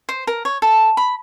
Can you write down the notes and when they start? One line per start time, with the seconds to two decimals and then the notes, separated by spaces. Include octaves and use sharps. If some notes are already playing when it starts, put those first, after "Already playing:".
0.09 C5
0.27 A#4
0.45 C#5
0.62 A4
0.97 B5